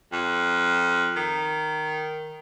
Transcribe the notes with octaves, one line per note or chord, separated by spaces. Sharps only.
F2
D#3